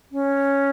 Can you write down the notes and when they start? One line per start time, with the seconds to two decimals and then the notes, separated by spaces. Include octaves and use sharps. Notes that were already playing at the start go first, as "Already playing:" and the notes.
0.12 C#4